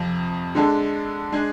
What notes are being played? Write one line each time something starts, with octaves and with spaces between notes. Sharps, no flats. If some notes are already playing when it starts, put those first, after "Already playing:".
Already playing: F2 C3 F3
D3 G#3 D4 A4
G#3 D4 G#4